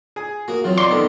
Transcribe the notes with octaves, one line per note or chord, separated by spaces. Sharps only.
G#4 G#5
A#3 F#4 G#4 A#4
E3 F#3 C4 F4
B2 G4 D5 A#5 C6
D#3 B3 A4 D#5